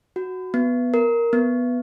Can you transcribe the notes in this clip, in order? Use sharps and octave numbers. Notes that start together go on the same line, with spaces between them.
F#4
B3
A#4
B3